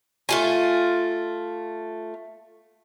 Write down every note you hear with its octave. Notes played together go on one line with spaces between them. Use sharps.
A3 F4 G#5